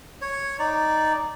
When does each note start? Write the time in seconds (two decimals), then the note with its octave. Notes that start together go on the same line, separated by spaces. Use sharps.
0.22 C#5
0.59 D#4 D5